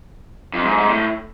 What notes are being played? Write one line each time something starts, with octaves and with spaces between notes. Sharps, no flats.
F2
G#2
G#2
A2